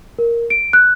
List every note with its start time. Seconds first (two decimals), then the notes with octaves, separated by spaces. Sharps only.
0.19 A#4
0.50 D7
0.73 F#6